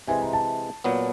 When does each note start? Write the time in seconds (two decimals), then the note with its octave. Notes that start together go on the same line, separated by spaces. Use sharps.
0.07 C3 E3 G#3 C4 G#5
0.21 A#5
0.33 A5
0.84 A#2 F#3 B3